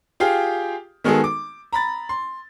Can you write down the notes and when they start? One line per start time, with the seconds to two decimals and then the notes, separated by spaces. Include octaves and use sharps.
0.20 F4 G4 G#4 F5 G5
1.04 D#3 G#3 B3 F#4 G#4 A4
1.24 D6
1.73 A#5 B5 A6
2.09 C6